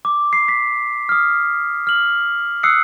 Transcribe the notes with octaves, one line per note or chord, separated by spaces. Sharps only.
D6
C7
B6
D#6 F6
F6 F#7
D#6 E6 F#6 C7 C#7